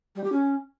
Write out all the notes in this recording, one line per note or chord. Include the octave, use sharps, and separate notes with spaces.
G3
G4
C#4